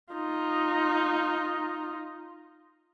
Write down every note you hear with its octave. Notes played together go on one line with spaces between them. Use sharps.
D#4 F4